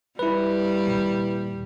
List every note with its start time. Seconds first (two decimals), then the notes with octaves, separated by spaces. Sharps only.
0.19 G3 E4 B4
0.85 D#2 A#2